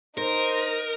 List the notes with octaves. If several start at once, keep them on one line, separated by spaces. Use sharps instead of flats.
D#4 A#4 C5